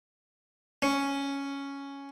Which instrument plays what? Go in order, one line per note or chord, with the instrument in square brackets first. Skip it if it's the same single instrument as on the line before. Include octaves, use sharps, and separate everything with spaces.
[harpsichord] C#4